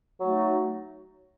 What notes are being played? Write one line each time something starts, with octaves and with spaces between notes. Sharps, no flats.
F#3 A3 D#4 F#4